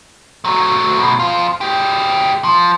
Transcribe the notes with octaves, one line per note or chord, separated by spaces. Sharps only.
F#3 A3
F#2 B2
F2 F4
G#3 G4
F3